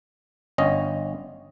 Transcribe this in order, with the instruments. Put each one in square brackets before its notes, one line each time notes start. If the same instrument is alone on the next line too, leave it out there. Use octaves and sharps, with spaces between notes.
[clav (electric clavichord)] G1 C#4 D#5